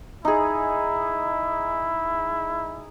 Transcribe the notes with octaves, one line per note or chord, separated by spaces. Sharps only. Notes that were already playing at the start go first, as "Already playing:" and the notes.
D#4 E4 G#4